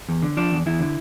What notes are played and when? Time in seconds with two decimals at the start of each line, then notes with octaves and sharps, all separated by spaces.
0.09 E2
0.22 D3
0.37 F3 D4
0.52 E2
0.66 E2 E4
0.80 D3